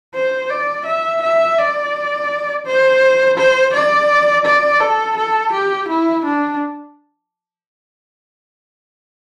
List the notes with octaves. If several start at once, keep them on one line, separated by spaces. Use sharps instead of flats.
C5
D5
E5
E5
D5
C5
C5
D5
D5
A4
A4
G4
E4
D4